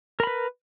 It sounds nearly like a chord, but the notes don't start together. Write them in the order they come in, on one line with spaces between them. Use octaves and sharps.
A#4 B5 B4